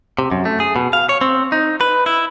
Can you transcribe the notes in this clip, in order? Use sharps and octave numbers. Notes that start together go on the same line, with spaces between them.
C3
F#2
A3
G#4
B2
F5
C#5
C4
D#4
B4
E4